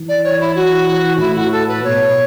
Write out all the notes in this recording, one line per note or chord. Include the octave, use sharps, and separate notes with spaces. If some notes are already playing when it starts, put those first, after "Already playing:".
Already playing: E3
D5
C#5
E4
F#4
A2 E4
F#4
A4
B4
B2 C#5